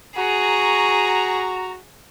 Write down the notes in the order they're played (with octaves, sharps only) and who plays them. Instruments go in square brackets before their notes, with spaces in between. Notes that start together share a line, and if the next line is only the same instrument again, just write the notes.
[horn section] F#4 A#5 [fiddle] G#4